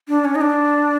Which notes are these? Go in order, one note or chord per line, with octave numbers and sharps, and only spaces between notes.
D4
C#4
D#4
D4